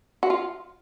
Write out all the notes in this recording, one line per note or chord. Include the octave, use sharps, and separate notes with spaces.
F#4
F4